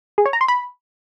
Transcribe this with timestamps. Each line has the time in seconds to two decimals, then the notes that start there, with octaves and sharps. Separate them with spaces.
0.18 G#4
0.26 C#5
0.33 A#5
0.41 C6
0.48 B5